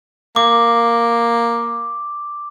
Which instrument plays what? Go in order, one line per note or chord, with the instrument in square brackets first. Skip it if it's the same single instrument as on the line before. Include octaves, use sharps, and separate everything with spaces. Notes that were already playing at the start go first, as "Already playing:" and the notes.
[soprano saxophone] A#3 [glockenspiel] D6